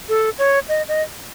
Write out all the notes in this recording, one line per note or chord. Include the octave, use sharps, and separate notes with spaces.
A4
C#5
D#5
D#5